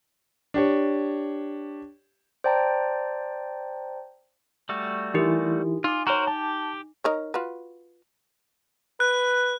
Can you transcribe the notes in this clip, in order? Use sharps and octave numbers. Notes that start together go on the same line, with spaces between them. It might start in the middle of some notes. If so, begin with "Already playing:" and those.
D4 G4 C#5
C5 D5 G5 A5 A#5
G3 A3 F#4
E3 D#4 E4 G4 A#4
D#4 F4 D6
F#4 A#4 C5 C#5 A#5
G4 A5
D#4 A#4 C#5
F4 F#4 B4
B4 F#6